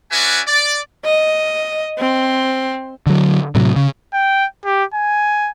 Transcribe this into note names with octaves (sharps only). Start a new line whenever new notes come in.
C#4 F#4 B4 D5 E5 G#5
D5
D#5
C4
D3 F#3
A2 C3 F#3
C#3
G5
G4
G#5